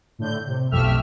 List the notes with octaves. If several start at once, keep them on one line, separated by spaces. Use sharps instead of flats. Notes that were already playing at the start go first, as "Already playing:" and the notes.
A2 D3 G6
C3
B1 F2 A3 G4 E5 F6